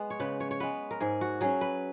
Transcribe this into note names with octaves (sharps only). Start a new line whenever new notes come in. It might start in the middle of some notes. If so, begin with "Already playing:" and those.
Already playing: G#3 B3
C#5
C#3 B4
C#5
C#5
G#3 B3 B4
A#4
G#2 G#4
F#4
F#3 C#4 G#4
B4